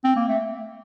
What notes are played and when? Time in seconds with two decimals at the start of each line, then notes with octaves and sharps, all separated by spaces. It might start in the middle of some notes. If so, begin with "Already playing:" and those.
0.04 C4
0.16 A#3
0.28 A3